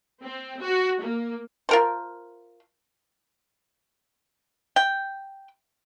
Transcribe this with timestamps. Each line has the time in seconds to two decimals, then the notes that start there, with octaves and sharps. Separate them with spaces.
0.25 C4
0.62 F#4
1.02 A#3
1.69 F4 A#4 C5
4.76 G5